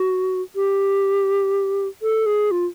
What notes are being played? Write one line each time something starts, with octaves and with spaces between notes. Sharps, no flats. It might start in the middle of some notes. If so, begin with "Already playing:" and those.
Already playing: F#4
G4
A4
G#4
F4